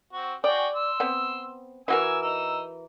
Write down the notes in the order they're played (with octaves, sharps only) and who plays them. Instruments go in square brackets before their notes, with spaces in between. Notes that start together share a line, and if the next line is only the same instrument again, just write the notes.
[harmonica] C4 F#4
[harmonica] F#4 G#4 G5 [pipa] D5
[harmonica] C6 E6
[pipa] B3 C4
[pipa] E3 F#4 A#4 [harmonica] G#5 E6
[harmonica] D#4 E6